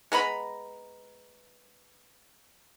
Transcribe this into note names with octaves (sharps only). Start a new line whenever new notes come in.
G#3 B3 A#5 B5